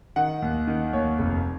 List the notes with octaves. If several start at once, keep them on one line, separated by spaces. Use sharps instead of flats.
D#3 F#5
D#2
D#3
D#2 C#5
F1